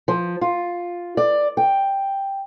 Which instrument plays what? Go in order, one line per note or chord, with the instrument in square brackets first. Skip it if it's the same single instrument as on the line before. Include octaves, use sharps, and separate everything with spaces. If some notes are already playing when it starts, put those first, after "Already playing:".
[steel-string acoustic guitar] F3
F4
D5
G5